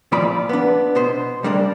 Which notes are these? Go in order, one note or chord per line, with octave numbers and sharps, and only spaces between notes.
A#2 F3 A#3 F4 D5 B5
B3 D4
B2 B3 C5
G3 A#3 D4 A#4